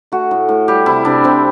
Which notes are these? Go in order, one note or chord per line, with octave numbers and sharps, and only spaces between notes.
A3 F#4
A2
A2
G3 G4
C3 E4
C3 D4
C3 C4